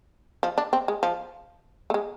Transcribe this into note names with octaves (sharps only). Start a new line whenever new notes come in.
F3
D4
C4
G#3
F3
A3
G#3